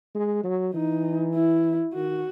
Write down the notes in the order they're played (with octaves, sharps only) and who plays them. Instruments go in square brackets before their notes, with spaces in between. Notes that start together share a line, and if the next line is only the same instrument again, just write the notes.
[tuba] G#3
F#3
[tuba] E3 [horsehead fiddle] D#4
[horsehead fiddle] E4
[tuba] D#3 [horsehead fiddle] F#4